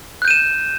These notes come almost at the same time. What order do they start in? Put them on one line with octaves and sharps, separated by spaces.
F#6 G6 D#7 E7